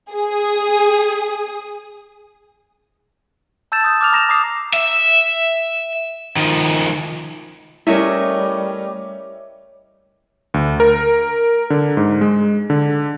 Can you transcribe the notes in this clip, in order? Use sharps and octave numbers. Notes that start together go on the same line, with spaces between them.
G#4 D#6
A5 E6 G6 A6 E7
D#6 G6
D6 F6 F7
A#5 A#6 E7 F7
A#5 D6 D#6 C7
E5
D#3 F3
G3 A3 C#4 E4 A#4 C#5 D#5 E5
D2
A#4
D3
G#2
G#3
D3